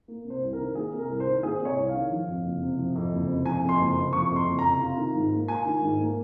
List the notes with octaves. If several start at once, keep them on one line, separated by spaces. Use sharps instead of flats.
A#3
C3
C5
C2
A#4
D#3
A#3 G#4
C3
A#4
C2
C5
D#3
A#3 G#4
C3
C#5
C2
F5
D#3
F3
F2
F#1
C3
F3
F2
F#1
C3
F3 G#5
F2
C6
F#1
C6
C3
F3 C#6
F2
C6
F#1
A#5
C3
F4
D#3
G#2
A#3
F4 G#5
D#3
G#2
A#3